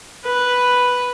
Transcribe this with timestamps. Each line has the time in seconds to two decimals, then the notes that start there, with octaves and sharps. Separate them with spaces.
0.24 B4